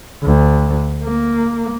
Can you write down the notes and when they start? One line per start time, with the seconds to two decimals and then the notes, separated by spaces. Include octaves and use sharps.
0.23 D2
1.04 A#3